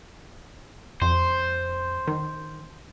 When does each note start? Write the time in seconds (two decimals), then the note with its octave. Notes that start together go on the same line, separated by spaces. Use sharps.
1.02 F2 C5
2.07 D#3